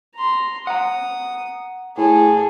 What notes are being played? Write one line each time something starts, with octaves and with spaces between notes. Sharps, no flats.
A#5 C6
F#5 A#5 D#6
A2 G#4 A4